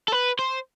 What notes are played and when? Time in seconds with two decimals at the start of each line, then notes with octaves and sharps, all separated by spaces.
0.08 A4
0.12 B4
0.39 C5